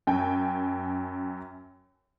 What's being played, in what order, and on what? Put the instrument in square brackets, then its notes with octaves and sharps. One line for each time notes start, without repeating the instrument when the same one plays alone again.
[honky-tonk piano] F#2 G5 G#5